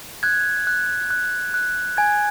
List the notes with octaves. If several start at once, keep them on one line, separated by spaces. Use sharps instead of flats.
F#6 G#6
F#6
F#6
F#6
G#5 G#6